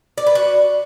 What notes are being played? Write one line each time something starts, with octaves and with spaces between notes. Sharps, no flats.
D5
B4
F#4